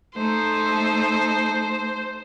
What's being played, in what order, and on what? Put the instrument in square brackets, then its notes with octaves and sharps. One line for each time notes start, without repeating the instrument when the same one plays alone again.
[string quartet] A3 D#4 A4 [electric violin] C5